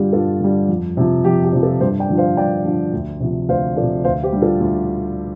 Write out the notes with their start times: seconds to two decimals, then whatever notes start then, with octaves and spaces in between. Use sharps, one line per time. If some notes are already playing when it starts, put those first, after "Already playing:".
Already playing: G2 D3 G3 F4 G4
0.13 G2 F4 A4
0.41 D3 G3
0.69 F2
0.97 C3 F3
1.24 F2 G4
1.44 G4
1.53 C3 F3
1.62 F4 A4
1.80 G2 G4 C5
1.99 D5 G5
2.09 D3 F3
2.18 C5 F5
2.37 G2 D5 G5
2.65 D3 F3
2.93 D2
3.20 C3 F3
3.48 D2 C5 F5
3.76 F3 A4 D5
3.82 C3
4.04 D2 C5 F5
4.23 G4 C5
4.33 D3 G3
4.42 F4 A4
4.60 D2